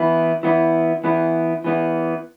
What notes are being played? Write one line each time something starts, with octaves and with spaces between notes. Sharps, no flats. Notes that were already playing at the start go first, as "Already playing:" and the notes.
Already playing: E3 B3 E4
E3 B3 E4
E3 B3 E4
E3 B3 E4